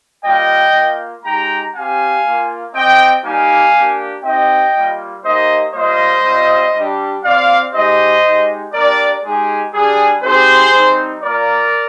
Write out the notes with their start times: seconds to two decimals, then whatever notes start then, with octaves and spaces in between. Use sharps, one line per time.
0.25 G3 A#3 F4 D#5 G5
0.75 A#3 F4
1.24 G#3 D#4 G4 G5 A#5
1.74 C4 G4 F5 G#5
2.25 A#3 F4
2.74 C4 G4 D#5 G5
3.24 G3 A#3 D#4 G4 F5 G#5
3.74 A#3 D4 G4
4.24 C4 D#4 G4 D#5 G5
4.74 G3 A#3 F4
5.24 A#3 D#4 G4 C5 D#5
5.74 G3 A#3 F4 C5 D#5
6.23 G3 C4 F4
6.74 G3 D4 G4
7.23 C4 F4 D5 F5
7.74 G#3 D#4 G4 C5 D#5
8.23 G#3 D#4 G4
8.73 A#3 D4 G4 A#4 D5
9.23 G#3 D#4 G4 G#4
9.73 G3 D4 G4 G#4
10.23 C4 D#4 G4 G#4 C5
10.73 G3 C4 D#4
11.23 A#3 F4 A#4 D5